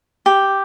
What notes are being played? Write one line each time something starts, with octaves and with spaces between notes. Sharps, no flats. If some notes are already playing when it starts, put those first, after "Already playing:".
G4